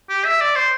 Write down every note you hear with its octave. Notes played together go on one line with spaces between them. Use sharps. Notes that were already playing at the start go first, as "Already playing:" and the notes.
G4
E5
D5
C5